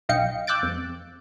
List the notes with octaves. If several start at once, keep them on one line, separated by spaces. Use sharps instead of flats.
B1 D#5 F5 G5 C#7
D6 E6 F#6 G6 A6 D7
F2